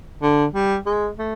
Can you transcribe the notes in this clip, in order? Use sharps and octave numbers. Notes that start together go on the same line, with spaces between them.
D3
G3
G#3
A3